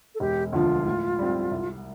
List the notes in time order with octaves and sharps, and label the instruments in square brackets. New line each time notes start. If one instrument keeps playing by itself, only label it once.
[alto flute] A4
[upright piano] E1 [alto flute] G4
[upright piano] D2 D3 F3 [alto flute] F4
[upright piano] A2
G3 C4
C2